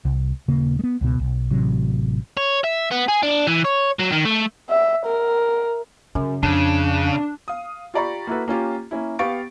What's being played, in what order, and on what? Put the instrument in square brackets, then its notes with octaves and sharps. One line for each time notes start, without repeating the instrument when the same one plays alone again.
[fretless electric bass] C2
D#1 C#3 A#3
G#3 B3
C#2 B2
B1
A1 C3 F#3
[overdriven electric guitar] C#5
E5
B3
G#4
D4
E3
C#5
F#3
D#3
A3
[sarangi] E5
A#4
[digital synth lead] F#2 [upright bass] C#3
[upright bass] F2 [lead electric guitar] C#3 [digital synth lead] D4
[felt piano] F5 D#6
F4 G4 D5 A#5 B5 C#6
A#3 E4 F#4 A4 B4
A#3 C#4 F4 G4
A#3 C#4 E4
B3 G4 F5 C#6 A6 D7